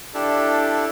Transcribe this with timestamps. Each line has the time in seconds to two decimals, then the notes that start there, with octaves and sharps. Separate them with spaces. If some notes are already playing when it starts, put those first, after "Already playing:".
0.14 D4 E4 G4 A4 D5